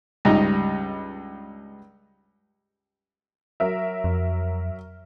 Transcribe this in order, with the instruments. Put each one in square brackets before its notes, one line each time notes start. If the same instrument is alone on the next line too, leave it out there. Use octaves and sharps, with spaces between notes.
[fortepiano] C#2 G2 D#4 D#5 A#5
[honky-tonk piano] F#3 A#4 E5
[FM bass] F2